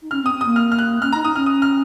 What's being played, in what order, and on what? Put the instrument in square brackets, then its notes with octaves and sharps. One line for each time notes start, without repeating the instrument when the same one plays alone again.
[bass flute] D#4
[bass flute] C#4 [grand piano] F6
[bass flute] C4
[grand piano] D#6
[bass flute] C4
[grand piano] D#6
[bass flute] A#3
[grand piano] F6
F6
F#6
[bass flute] C#4 [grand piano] F6
[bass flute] D#4 [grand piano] A#5
[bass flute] D#4 [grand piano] D#6
[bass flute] C#4 [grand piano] F6
[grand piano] D#6
F6